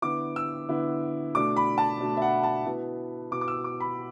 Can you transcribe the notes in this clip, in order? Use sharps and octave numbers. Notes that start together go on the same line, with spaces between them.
D3 B3 E4 D6
E6
D3 B3 E4
B2 A3 D4 D6
B5
A5
B2 A3 D4
E5
F#5
A5
B2 B3 E4
B2 B3 E4 D6
D6
E6
D6
B5